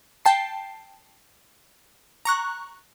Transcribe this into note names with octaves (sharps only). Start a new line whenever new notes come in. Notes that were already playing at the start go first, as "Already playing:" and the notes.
G5 A5 C7
A#5 C#6 F#6